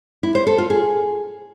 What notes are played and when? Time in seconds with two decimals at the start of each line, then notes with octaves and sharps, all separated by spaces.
0.23 E4
0.35 C5
0.47 A4
0.58 F4
0.70 G#4